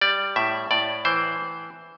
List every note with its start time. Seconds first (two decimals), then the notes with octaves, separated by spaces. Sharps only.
0.01 G3 D5
0.36 A2 E5
0.71 A2 D5
1.05 E3 C5